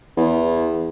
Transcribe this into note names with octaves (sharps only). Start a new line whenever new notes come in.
E2